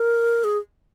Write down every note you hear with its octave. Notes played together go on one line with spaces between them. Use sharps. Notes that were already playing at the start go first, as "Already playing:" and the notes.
Already playing: A#4
G#4